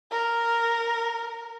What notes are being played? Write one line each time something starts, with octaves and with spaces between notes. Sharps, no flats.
A#4